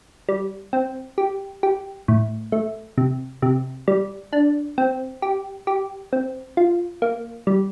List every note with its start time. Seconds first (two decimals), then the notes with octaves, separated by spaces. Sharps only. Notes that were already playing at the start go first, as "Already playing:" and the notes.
0.29 G3
0.73 C4
1.18 G4
1.63 G4
2.08 A2
2.52 A3
2.98 C3
3.42 C3
3.88 G3
4.32 D4
4.78 C4
5.22 G4
5.67 G4
6.13 C4
6.57 F4
7.02 A#3
7.47 G3